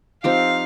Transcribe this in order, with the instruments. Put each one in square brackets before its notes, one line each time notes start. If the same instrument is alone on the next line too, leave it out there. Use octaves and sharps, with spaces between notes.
[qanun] F3 C4 D#4 G4 [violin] F5